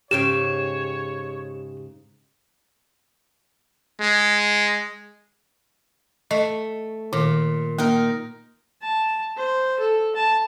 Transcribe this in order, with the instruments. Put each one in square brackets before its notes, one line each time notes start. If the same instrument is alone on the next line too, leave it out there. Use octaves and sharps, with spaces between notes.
[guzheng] G#2 C#3 G5 [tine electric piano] G4 [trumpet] C#5 [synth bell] E7
[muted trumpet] G#3
[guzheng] A3 [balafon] D#5
[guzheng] A#2 [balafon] D#3
[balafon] A#3 [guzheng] D#4 A#4
[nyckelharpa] A5
C5
A4
A5